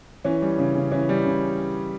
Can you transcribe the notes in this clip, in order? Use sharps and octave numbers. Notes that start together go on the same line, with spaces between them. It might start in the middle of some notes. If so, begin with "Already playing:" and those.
E3 C#4
G3
C#3
C#3
E3 C#4
G3
C#3